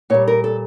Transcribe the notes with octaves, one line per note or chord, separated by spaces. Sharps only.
A#2 G3 C#5
A#4
A4